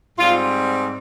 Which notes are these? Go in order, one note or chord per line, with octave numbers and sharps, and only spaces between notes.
G#2 G3 C4 F4